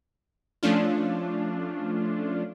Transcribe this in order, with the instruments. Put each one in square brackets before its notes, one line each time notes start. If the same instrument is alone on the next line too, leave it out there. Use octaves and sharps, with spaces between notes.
[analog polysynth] F3 A3 C#4 D4 F4